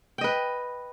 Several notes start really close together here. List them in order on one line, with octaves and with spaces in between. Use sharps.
G5 D#5 B4